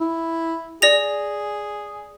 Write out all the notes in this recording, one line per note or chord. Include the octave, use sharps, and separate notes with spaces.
E4
G#4 D5 A#6 F7